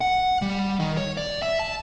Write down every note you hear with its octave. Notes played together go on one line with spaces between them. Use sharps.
F#5
G3
D#3
C#5
D5
E5
A5